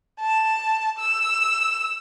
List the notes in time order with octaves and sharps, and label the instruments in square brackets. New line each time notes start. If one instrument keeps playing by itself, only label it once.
[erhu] A5
E6